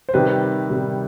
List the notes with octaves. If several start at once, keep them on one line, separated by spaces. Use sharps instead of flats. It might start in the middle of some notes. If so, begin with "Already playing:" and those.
C5
C3 D#3 G3 B4
C3 D#3 G3